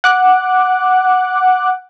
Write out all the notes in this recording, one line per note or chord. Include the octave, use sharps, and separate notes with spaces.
F#5 D6 F#6